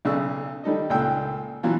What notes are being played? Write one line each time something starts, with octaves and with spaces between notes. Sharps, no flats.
B1 C#3 D4 A4 E6
D#3 G3 A4 D#5
C#2 A#2 A3 G5 E6
B2 E3 F#3 F4